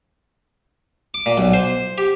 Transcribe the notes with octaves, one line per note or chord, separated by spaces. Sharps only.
D6
A#2
B1
C5
G4